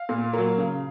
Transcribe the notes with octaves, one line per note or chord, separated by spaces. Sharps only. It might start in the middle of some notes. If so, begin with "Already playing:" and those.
Already playing: F5
A#2
F#3 A#3
C#3